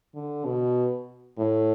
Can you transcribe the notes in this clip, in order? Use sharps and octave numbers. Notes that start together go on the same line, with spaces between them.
D3
B2
A2